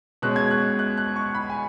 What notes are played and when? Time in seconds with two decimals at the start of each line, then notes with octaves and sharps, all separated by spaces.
0.22 B2 G#3 C#4 F#6
0.36 G#6
0.51 F#6
0.79 F#6
0.97 F#6
1.16 C#6
1.35 B5
1.50 G#5